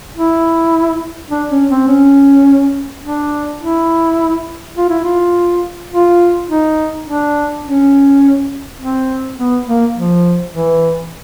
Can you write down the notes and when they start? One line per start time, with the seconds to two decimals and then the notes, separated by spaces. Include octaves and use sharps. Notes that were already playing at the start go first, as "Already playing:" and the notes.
0.16 E4
1.30 D4
1.50 C#4
1.70 C4
1.88 C#4
3.04 D4
3.61 E4
4.77 F4
4.90 E4
5.04 F4
5.92 F4
6.49 D#4
7.07 D4
7.65 C#4
8.79 C4
9.37 B3
9.66 A#3
9.96 F3
10.52 E3